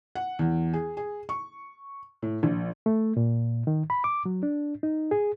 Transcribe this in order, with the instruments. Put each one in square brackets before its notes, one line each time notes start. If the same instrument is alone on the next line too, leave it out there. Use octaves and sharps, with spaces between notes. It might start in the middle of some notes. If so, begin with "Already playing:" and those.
[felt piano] F#5
E2
G#4
G#4
C#6
A2
A#1
[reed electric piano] A3
A#2
D#3
B5
D6
F#3
D4
D#4
G#4